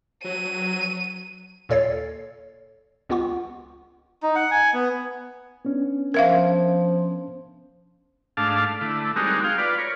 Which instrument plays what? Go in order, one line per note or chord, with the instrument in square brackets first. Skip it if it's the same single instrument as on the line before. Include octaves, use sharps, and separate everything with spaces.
[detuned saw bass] F#3 [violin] D#7
[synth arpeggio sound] D#2 A#2 A4 C#5 A6 C7
C#2 B3 F4 F#5 C#6
[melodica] D#4
F#5
G#5
B3
[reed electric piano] B3 C#4 D4
[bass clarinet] F3 [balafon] A#4 E5 F5
[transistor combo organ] G#2 A3 D4 F5 A5
D3 A3 E4
G3 G#3 C4 D#4 F#4 A#4
G#4 F5 G5
F4 B4 D5
A#4 C#5